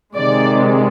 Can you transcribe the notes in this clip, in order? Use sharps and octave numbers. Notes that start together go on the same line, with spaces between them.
C3 D#3 G#3 D5